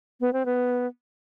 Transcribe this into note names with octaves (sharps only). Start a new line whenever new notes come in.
B3
C4
B3